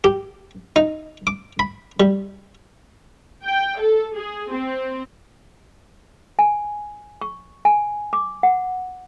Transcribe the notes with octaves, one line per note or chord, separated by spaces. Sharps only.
G4
D#4
D6
B5
G3
G5
A4
G#4
C4
G#5
C#6
G#5
D6
F#5